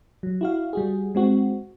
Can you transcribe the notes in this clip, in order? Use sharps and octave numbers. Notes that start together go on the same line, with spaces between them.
F#3
E4 F#4 F5
G3 F#4 G#4
G#3 C4 F#4